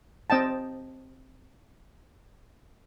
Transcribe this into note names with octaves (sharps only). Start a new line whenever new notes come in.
C4 D#5 G5 A5